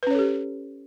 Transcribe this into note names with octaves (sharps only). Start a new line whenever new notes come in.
C#4 G4 A4 B4 C#5